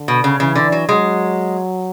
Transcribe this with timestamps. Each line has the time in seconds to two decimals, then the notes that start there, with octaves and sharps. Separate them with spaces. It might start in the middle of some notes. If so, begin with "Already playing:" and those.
Already playing: D3
0.08 B2
0.24 C#3
0.40 C#3 E3
0.55 D3
0.72 F#3
0.88 F#3 G#3